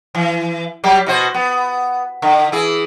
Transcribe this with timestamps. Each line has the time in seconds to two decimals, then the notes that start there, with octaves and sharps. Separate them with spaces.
0.15 E3
0.84 F#3 G3 G4
1.06 B2 F#4 C5
1.34 B3
2.22 D3
2.52 E3 G#4